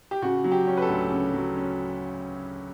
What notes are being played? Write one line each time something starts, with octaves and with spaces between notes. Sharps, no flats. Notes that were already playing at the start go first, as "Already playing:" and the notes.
G4
C#3 F#4
F#3
G4
C#4
B4
A4
D2
C#3
F#3
C#4